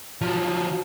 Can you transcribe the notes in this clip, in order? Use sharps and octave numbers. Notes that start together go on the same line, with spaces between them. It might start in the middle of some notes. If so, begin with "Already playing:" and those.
F3 F#3